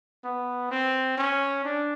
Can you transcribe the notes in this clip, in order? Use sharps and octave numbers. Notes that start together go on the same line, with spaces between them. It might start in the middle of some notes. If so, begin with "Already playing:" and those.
B3
C4
C#4
D4